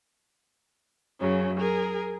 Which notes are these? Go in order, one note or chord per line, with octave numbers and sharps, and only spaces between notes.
F#2 C#3 F#3
G#4 A#4